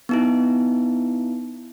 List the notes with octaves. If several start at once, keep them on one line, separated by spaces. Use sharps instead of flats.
B3 D#4 E4